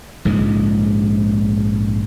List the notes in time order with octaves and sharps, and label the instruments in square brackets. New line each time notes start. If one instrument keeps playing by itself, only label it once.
[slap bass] A#1 G#2 C#3 G#3